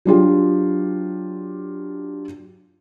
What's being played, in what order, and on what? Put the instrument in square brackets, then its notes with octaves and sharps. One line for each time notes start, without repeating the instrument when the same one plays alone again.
[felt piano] F#3 D4 F4 G4